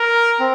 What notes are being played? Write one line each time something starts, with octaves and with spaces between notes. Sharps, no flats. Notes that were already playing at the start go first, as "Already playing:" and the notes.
Already playing: A#4
C4